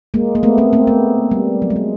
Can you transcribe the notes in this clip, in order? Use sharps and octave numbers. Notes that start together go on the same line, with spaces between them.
G#3 A#3
A#3
A3 B3
A#3 C4
A#3 C4
A3 B3
G3
F#3
G#3
G3